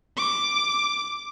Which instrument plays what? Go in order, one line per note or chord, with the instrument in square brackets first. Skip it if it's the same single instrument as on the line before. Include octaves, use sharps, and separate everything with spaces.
[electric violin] D6